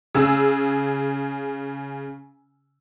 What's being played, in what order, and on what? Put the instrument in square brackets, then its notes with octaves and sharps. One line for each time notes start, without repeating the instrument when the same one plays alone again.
[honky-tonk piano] C#3 G#4 E6